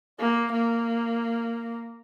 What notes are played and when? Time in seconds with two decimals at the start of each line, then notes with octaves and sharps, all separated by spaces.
0.19 A#3
0.53 A#3